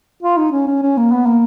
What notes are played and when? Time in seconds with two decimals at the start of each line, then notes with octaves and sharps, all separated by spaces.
0.23 F4
0.38 D#4
0.52 C#4
0.68 C#4
0.83 C#4
0.98 A#3
1.12 B3
1.27 A#3